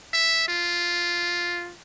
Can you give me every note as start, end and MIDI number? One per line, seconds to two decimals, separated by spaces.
0.14 0.47 76
0.48 1.74 65